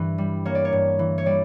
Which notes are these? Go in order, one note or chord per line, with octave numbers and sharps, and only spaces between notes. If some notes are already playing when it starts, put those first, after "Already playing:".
Already playing: G2 E3 B4
G3
A#3 C#5
D5
C#5
G2
E3
C#5
G3 D5